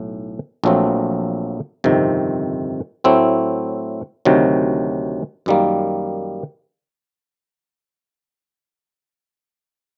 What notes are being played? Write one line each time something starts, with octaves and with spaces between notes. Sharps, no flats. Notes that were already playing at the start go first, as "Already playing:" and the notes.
Already playing: B1 A2
A#1 A#2 F#3 A3 C4
G1 F2 C3 D#3
A2 F#3 A3 C4 E4
D2 C3 D#3 F#3
F#2 D#3 G3 A#3